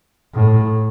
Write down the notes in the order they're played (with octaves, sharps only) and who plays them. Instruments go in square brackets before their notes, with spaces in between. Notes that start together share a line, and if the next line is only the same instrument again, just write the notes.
[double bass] A2